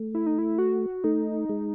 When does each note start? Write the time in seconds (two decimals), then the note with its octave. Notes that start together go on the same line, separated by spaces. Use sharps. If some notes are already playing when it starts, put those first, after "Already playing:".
Already playing: A3
0.15 E4
0.26 D#4
0.38 E4
0.58 F#4
1.04 A3 D#4
1.49 G#3